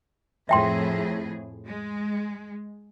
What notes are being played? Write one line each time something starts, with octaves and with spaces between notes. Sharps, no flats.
F2 A2 G#4 E5 G5 C6
G#3